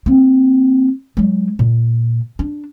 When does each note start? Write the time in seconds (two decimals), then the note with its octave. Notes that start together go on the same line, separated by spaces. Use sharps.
0.06 A#3 C4
1.17 F#3 G#3
1.59 A#2
2.39 D4